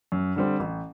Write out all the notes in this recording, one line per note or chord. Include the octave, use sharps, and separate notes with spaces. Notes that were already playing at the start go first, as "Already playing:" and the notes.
F#2
D3 G3 C4
A1